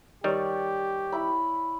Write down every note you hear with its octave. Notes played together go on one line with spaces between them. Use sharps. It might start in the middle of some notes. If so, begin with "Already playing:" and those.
D#3 G3 G4 C#5 D5
E4 B5